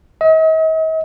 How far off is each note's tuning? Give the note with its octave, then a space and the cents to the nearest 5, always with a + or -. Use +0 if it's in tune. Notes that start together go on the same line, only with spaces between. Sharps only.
D#5 +45